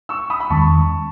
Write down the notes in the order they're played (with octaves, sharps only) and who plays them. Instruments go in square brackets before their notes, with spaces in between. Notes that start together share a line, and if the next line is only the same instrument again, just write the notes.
[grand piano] C#6 E6
B5 D#6
B5
[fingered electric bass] E2 D#3 G#3 C#4 [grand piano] A5 C#6